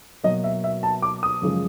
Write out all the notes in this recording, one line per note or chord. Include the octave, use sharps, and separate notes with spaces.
B2 F#3 A#3 D#5
E5
E5
A5
D6
D#6
F#2 C#3 F3 G#3